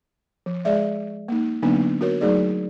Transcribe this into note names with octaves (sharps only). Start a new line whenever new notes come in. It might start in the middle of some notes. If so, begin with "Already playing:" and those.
F3
G#3 G#4 D5 E5
A#3 D#4
D3 F#3 A#3 B3 D4 D#4
F#4 A#4 C#5
F#3 A3 D#4 G#4 D5